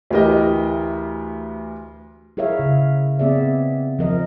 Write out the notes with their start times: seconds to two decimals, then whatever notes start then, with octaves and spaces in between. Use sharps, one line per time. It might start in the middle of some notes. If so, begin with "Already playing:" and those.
0.10 D2 E3 G4 A#4 D#5
2.37 E4 G#4 A#4 C#5 E5 F5
2.59 C#3
3.19 B3 C4 G#4 D5 E5
3.99 F3 A#4 D#5